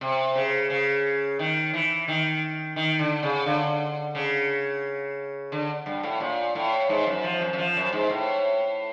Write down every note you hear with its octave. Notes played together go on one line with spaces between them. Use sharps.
C3
C#3
C#3
D#3
E3
D#3
D#3
D3
C#3
D3
C#3
D3
G2
A2
A#2
A2
G#2
F#2
F3
F#2
F#2
F3
F#2
G#2
A2